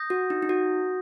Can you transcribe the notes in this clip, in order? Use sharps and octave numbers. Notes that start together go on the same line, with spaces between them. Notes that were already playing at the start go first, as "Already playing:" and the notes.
Already playing: D#6 G6 A#6
F#4
D#4
D#4
F#4